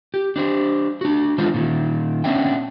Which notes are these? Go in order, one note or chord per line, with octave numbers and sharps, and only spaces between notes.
G4
D4 G4 C5
D4 F#4
E3 G#3 D4 F4 C5
A#2 D#3
B3 C#4 D4 E5 G5